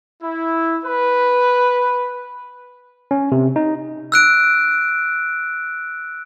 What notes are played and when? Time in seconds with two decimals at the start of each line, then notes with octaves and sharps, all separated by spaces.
0.23 E4
0.85 B4
3.11 C#4
3.32 C3
3.56 D#4
4.12 E6 F#6 D7